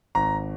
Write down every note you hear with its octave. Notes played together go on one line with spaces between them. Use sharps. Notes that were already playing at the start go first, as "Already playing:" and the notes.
G#1 A#5